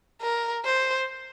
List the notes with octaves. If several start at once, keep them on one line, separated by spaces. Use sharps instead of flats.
A#4
C5